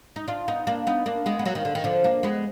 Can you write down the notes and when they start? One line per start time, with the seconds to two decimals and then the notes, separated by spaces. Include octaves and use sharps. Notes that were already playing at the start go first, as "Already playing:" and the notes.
0.16 D#4
0.28 D4 F4
0.48 B3 D#4
0.67 A#3 D4
0.87 B3 D#4
1.06 A#3 D4
1.26 G#3 B3
1.39 B3
1.45 F#3 A#3
1.55 D#3
1.65 D3
1.75 D#3
1.84 D3 F3
2.04 A#3 D4
2.23 G#3 B3